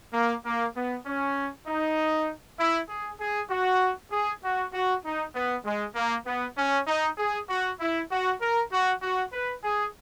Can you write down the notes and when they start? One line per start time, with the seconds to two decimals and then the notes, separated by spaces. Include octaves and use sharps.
0.13 A#3
0.45 A#3
0.76 B3
1.06 C#4
1.68 D#4
2.60 E4
2.89 G#4
3.21 G#4
3.51 F#4
4.12 G#4
4.44 F#4
4.73 F#4
5.05 D#4
5.35 B3
5.65 G#3
5.96 A#3
6.26 B3
6.58 C#4
6.87 D#4
7.18 G#4
7.50 F#4
7.80 E4
8.11 F#4
8.41 A#4
8.71 F#4
9.02 F#4
9.33 B4
9.64 G#4